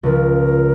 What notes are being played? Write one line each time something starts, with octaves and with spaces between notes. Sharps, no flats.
C#2 C#3 F3 A#4